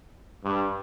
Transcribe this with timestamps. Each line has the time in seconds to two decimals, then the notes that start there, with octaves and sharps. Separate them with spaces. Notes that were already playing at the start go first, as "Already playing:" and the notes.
0.44 G2